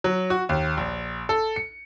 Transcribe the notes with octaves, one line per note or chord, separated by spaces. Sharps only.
F#3
F#4
D#2
A#1
A4
C#7